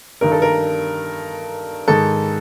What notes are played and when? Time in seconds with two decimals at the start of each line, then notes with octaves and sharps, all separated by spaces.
0.21 G2 D#3 A#4
0.32 A4
0.42 A#4
1.88 G#2 D#3 A4